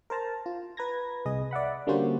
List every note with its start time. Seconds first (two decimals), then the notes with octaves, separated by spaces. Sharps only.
0.10 A#4 C5 A5 A#5
0.46 F4
0.77 B4 A#5 G#6 A#6
1.26 C2 G#4 D#5
1.51 D5 E5 F#5 B5
1.87 D3 G3 A#3 C#4 F#4 C5